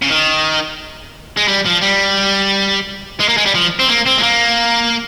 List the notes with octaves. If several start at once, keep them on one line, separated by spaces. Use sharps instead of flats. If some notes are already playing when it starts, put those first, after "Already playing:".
C#3
D#3
G#3
G3
F3
G3
G#3
A#3
G#3
G3
F3
C4
A#3
C4
G#3
A#3